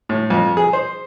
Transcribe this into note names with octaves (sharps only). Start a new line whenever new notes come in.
A2
F2
G#4
C5